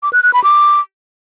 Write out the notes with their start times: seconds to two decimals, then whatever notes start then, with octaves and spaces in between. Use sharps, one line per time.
0.03 D6
0.13 F#6
0.23 F#6
0.33 B5
0.44 D6